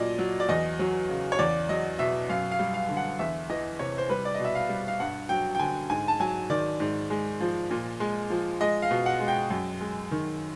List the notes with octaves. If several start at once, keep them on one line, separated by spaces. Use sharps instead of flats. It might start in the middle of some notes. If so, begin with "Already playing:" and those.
Already playing: A#2 F#3 D5 D#5
F#3
D5
E2 D#5
F#3
C#3
C#5
E2 D5
F#3 D#5
B2 E5
F#2 F5
F5
G3
F5
D3
F#5
E2 E5
E3 D#5
C3 C#5
C5
G3 B4
D5
B2 D#5
E5
F5
G3
F5
G2 F#5
F#3 G5
G5
D3 G#5
G#2 G#5
A5
F#3 G#5
D#3 D5
G#2
G#3
F3
A#2
G#3
F3
G#3 D#5
F5
B2
F#5
G#3
G5
F#2
G#3
D#3